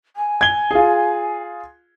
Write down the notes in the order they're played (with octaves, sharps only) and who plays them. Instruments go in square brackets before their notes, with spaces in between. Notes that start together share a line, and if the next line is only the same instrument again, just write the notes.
[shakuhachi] G#5
[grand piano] G#6 G7
F4 G#4